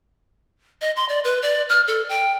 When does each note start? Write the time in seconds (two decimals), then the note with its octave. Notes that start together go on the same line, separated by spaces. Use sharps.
0.81 D#5
0.96 C6
1.09 D5
1.24 B4
1.42 D5
1.69 F6
1.87 A4
2.09 G5